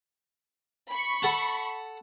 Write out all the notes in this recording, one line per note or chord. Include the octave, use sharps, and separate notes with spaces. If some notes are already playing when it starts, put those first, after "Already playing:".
B5 C#6
A4 F#5 A5